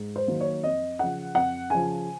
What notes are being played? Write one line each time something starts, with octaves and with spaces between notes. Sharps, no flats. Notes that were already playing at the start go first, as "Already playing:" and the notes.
Already playing: G#2
C5
D#3 F#3 A#3
C#5
F2 D#5
C#3 F3 F#5
F2 F#5
C#3 F3 G#5